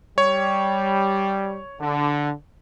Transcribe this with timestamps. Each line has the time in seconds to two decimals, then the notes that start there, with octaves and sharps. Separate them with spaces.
0.18 G3 C#5
1.80 D3